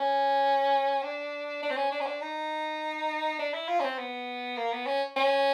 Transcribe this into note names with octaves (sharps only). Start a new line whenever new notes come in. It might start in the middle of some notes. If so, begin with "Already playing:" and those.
Already playing: C#4
D4
D4
C4
C#4
D4
C#4
D4
D#4
D4
E4
F4
C#4
C4
B3
A#3
B3
C#4
C#4